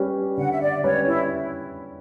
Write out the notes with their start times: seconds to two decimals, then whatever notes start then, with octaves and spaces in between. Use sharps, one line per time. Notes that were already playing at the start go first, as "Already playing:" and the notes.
Already playing: G3 C#4 G4 B4
0.37 D3 F#5
0.51 E5
0.61 D5
0.84 G3 C#4 G4 B4 C#5
1.07 E4